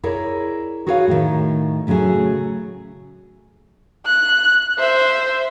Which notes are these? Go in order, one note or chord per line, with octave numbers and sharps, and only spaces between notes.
E4 G#4 A#4 C#5 D5
F#4 G#4 B4 C#5 D#5 F5
A2 D#3
A2 C#3 F#3 A3 G#4
F#6
C5 E5